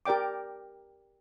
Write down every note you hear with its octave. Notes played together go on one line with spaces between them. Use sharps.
G4 A#4 D5 G5 D6